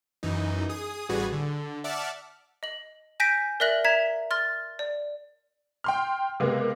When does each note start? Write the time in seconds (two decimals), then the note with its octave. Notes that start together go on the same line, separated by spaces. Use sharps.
0.23 F#2 E3 D#4
0.69 G#4 D#6
1.09 A1 G3 F#4 G#4 B4 G#5
1.33 D3
1.84 D5 E5 F#5 A5 D6 F6
2.63 D#5 F#7
3.20 G#5 G6 A#6 B6 D7
3.60 A#4 D5 E5 F#6 A#6 F#7
3.84 E5 A#5 G#6 B6 E7
4.31 C6 F6 A6
4.79 D5
5.84 G5 C6 F6
6.40 C3 G#3 A#3 B3